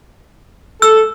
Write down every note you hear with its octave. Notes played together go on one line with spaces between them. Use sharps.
A4 E6